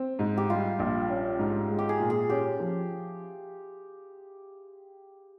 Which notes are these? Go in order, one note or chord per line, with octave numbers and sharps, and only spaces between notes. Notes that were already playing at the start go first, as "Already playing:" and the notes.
Already playing: C4
G#2
G4
G3 F4
A#1
C#4
G#2
G#3
G4
G#4
A#2
G#4
C#4 G4
F3